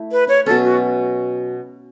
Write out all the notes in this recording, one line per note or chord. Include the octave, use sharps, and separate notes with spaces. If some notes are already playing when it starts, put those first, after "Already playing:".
Already playing: A3 E4
B4
C#5
B2 F#3 C#4 A4
F#4